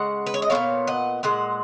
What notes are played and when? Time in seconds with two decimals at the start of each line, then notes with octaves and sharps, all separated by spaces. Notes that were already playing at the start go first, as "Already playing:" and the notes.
Already playing: C#3 G#3 F#5
0.26 B4
0.34 C#5
0.42 D#5
0.50 G#3 B3 C#5 F5
0.55 A#2
0.87 D#5 F#5
1.23 A#2 G#3 F#5